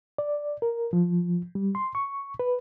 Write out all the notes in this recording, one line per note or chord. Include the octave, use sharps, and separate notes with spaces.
D5
A#4
F3
G3
C6
C#6
B4